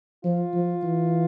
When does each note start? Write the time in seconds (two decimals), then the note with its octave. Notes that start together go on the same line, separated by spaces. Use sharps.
0.24 F3 F4
0.54 F3
0.84 E3